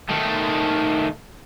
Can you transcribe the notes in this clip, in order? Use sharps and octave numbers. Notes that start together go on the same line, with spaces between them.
D#3 A3